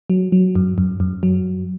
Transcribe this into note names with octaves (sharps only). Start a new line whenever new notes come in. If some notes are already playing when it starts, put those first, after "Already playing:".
F#3
F#3
F#2
F#2
F#2
F#3